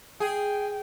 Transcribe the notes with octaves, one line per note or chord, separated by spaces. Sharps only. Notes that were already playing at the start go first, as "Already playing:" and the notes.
G#4 G5